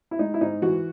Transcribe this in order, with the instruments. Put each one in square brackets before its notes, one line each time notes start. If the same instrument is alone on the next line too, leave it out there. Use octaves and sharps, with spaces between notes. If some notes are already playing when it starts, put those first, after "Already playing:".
[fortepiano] E4
G#3 D#4
E4
G#2 D#4
E3 F#4